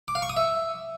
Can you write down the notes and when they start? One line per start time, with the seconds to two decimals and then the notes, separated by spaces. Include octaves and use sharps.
0.08 D6
0.15 F5
0.22 C#6
0.29 D#6
0.37 E5